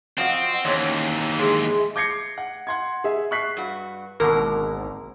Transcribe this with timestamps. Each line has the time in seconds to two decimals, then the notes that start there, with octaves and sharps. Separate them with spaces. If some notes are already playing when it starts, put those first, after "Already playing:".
0.18 F3 C4 F#4 D#5
0.65 D#2 E3 C4 C#4
1.39 G#3 E4
1.96 D6 G6 G#6 A#6 C7 C#7
2.38 F#5
2.67 F#5 C6 G#6
3.04 G#4 E5
3.31 C#6 F#6 B6 C7
3.57 G2 F#4
4.20 G#1 B2 D3 A#3 A#4